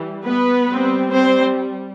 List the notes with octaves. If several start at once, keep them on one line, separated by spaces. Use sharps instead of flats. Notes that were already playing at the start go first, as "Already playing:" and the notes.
Already playing: E3 G3
B3 B4
G3 C4
C4 C5